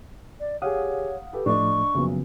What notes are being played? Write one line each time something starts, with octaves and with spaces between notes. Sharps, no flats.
D5
G4 G#4 C#5 F5 F#5 D#6
G4 A4 B4
A2 F3 A3 D4 D#5 C#6
F#1 B1 C#3 F3 B3